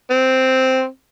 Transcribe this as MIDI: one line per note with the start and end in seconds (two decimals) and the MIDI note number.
0.11 0.86 60